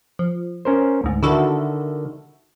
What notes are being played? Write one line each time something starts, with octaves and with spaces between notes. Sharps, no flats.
F3
C#4 A#4 C5
D2 G#2
D3 D#3 E4 F#4 A4